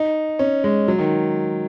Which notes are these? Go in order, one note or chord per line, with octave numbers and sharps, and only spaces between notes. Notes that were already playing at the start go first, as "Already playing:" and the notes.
Already playing: D#4
C#4
G#3
F#3
D#3